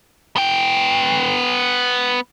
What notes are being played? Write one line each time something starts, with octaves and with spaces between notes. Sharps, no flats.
B3 G5